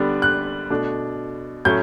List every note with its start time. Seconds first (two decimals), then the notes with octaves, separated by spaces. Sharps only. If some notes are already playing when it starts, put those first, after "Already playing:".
Already playing: D3 G3 B3 D4
0.22 F#6
0.70 B2 A3 D4
1.65 A2 F#3 C#4 G6